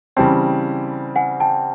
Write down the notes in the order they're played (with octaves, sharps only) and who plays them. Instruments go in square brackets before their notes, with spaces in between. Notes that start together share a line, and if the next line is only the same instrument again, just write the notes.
[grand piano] C#3 E3 G3 C4 [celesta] G5 A5
[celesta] F#5 G#5
G5 A5